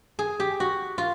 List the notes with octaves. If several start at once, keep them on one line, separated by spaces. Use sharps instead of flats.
G#4
G4
F#4
F4